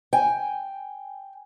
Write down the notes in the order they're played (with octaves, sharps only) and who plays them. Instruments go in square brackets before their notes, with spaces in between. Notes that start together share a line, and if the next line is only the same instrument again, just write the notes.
[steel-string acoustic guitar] G5 G#5